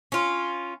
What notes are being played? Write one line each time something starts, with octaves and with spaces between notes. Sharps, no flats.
C#4 F4